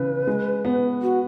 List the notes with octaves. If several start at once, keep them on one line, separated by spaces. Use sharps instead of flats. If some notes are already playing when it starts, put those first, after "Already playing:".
Already playing: C#3 E3 B4
G#3
B3
F#4